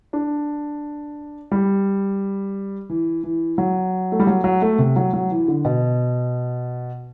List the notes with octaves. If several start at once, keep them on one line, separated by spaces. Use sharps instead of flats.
D4
G3
E3
E3
F#3
A3
G3
F#3
F#3
A3
C3
F#3
F#3
E3
D3
B2